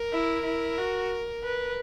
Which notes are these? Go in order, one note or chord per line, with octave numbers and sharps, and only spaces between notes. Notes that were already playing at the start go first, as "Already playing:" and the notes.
Already playing: A#4
E4
E4
F#4
B4